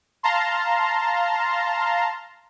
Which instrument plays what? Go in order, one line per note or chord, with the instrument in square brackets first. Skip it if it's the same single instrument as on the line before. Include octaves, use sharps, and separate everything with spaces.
[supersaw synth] F5 A5 A#5 C6